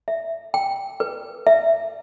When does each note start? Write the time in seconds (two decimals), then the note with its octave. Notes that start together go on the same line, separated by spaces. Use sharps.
0.08 E5
0.54 G5
1.00 B4
1.47 E5